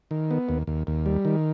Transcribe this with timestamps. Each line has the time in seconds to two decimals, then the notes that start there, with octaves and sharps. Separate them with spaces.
0.11 D#3
0.31 B3
0.49 D#2
0.67 D#2
0.87 D#2
1.06 G3
1.25 D#3